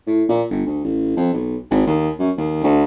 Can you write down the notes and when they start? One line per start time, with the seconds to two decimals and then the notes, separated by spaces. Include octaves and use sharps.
0.07 A2
0.29 A#2
0.50 G1
0.66 D2
0.84 A1
1.17 F2
1.33 B1
1.71 G#1
1.87 D#2
2.19 F#2
2.38 D#2
2.64 D2